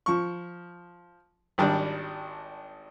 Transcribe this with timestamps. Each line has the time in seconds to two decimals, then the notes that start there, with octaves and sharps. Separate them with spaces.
0.06 F3 C#6
1.58 G#1 D#3 G3 D4